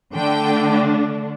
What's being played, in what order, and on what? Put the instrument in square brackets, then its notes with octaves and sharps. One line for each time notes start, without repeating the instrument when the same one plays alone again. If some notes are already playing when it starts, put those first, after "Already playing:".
[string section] D3 A3 D4 G5